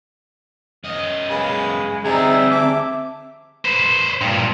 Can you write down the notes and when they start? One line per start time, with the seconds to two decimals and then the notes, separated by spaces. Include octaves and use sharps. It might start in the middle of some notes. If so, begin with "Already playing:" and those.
0.84 F#2 D#5
1.30 C#3 G#3 G#4 B4 F5
2.05 D2 G3 C4 D#4 G#4 D5 E5
2.51 A5 D6
3.65 B4 C5
4.21 G2 A#2